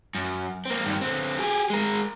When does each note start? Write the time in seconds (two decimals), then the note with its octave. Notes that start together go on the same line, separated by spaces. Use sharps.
0.15 F#2
0.65 A#3 C4
0.86 G2 D#3
1.01 D3 C4
1.39 G4 G#4
1.70 G#3 A#4